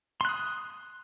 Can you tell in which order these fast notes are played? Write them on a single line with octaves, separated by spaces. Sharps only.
C6 F#6 D#6